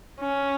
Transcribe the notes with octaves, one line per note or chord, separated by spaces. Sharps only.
C#4